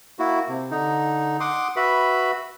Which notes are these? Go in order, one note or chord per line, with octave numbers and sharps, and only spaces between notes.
A#3 E4 F#4
C3
D3 D#4
F#5 C6 D6 D#6
F#4 B4 E5 B5